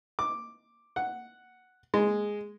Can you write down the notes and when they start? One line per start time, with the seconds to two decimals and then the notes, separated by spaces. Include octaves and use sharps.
0.19 D6
0.96 F#5
1.94 G#3